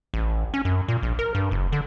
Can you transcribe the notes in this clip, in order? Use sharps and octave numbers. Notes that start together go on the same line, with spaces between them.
A1
C#4
F#2
A#2
A#1
A#4
G2
F#1
D3